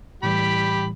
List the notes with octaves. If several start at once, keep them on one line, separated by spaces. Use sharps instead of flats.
A2 E3 G3 G4 B5